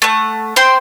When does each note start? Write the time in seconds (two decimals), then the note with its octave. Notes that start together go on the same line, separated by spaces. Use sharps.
0.02 A3 F#5
0.56 C5 G5 C6